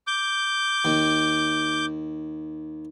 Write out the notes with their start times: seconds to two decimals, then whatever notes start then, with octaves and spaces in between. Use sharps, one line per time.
0.07 D6 G6
0.85 D#2